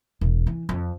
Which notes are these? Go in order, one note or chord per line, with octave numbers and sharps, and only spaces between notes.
E1
E3
F2